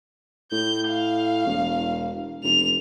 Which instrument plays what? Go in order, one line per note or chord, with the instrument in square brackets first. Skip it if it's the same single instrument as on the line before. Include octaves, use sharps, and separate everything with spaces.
[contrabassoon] A2 [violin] G6
[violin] F5
[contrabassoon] E1
[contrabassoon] F1 [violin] F7